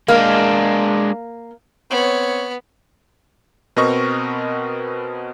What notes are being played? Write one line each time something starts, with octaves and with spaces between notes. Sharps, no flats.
G#3 A#3 D4
B3 C4 C#5
B2 B3 C4 A#4 D#5 C#6